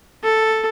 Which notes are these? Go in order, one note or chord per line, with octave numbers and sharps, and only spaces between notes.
A4